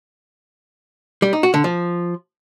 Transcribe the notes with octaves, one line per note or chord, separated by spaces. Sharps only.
G3
D#4
F#4
D3
F3